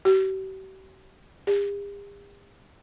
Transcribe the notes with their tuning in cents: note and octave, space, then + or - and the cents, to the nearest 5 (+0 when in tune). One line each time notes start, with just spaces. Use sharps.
G4 -45
G4 +45